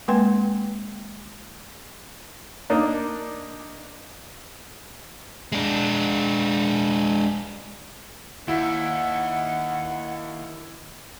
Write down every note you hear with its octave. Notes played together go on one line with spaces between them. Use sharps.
G#3 A#3 C4 B4 G5 C6
A#3 D4 D#4
G#3 D4
D#2 E4 F#5